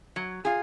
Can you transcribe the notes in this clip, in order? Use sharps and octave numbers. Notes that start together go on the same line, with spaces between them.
F#3
F4 G#4